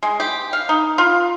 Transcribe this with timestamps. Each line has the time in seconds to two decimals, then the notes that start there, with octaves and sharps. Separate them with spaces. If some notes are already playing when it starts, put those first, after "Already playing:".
0.03 G#3
0.20 G4
0.53 F5
0.69 D#4
0.98 F4